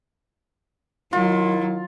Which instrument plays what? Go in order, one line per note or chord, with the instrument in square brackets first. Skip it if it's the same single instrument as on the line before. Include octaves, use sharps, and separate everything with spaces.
[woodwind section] D#3 E4 [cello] F#3 [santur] F4